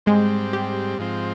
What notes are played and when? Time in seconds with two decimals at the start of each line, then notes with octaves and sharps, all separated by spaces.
0.06 G#2 G3 G#3 C4
0.53 G4
0.99 G#2 F3 C4